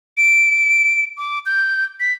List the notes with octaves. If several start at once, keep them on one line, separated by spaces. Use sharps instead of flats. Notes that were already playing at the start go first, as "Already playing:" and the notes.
D7
D6
G6
B6